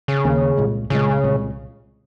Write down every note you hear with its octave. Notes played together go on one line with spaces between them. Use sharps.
C#3
D#2 D#3 A#3 C#4
C2 A#2 G#3
C2 A#2 C#3 G#3
C2 A#2 G#3